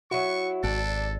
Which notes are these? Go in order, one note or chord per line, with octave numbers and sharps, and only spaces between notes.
F#3 E4 F#4 C#6
G#1 D4 A4